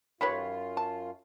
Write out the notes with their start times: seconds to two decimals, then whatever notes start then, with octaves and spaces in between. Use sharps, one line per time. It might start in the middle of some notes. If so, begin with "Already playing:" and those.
0.21 F#2 D#3 F4 G4 B4 C#5 B5
0.77 A5